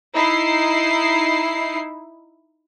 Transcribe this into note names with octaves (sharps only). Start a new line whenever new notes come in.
D#4 E4 C7